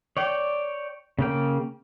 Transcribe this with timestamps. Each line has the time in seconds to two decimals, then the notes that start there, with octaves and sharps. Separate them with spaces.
0.17 C#5 D5 G5
1.19 C#3 A#3 G5